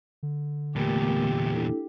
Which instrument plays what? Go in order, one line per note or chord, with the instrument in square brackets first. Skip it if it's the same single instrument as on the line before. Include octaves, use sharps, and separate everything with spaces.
[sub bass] D3
[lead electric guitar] E2 A#2 [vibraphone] A3 B3 A#4 [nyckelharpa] G4
[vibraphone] D4 E4 A4